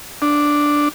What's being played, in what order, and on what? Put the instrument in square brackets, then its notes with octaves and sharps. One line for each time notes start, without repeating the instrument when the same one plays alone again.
[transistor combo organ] D4